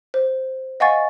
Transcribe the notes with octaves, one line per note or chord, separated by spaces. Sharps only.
C5
D#5 F5 F#5 G#5 C#6 A6